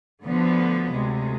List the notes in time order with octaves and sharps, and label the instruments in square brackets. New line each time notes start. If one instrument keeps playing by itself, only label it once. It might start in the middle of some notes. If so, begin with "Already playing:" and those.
[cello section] D2 D3 F3 B3
D2 C3 G#3